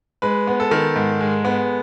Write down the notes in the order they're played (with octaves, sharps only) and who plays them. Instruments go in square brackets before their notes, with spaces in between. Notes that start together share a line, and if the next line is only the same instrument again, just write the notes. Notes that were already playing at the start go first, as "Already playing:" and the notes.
[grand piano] G#3 B4
B3
A4
D#3
G#2
G#3
B3